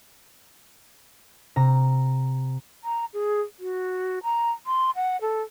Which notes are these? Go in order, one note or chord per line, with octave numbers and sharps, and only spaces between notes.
C3 A#5
A#5
G#4
F#4
A#5
C6
F#5
A4